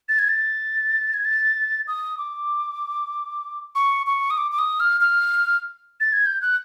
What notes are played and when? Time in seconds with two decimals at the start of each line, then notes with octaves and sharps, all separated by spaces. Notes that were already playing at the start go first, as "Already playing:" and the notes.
0.09 A6
0.19 G#6
0.29 A6
1.14 G#6
1.25 A6
1.88 D#6
2.18 D6
3.75 C#6
4.07 C#6
4.31 D#6
4.38 D6
4.51 D6
4.59 D#6
4.80 F6
5.01 F6
6.00 A6
6.13 G#6
6.26 G6
6.42 F#6